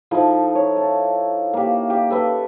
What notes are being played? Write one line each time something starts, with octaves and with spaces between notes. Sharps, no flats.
F3 D#4 E4 A4
C#5
A5
A#3 G4
G4 F5
A4 B4 E5